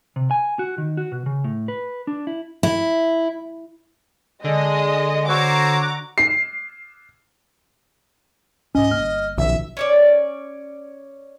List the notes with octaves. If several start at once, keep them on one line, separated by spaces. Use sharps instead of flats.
C3
G#5
F#4
D#3
F#4
B2
C#3
A2
B4
D4
E4
E4
D3 G#3 D#5
F#4 C5 C#5 A#5 D6 E6
C7
C2 G#2 C#4 D#5
G1 F#2 A#3 F6
B1 A#2 D#3 F3 C#4 E5
C#4 C#5 D5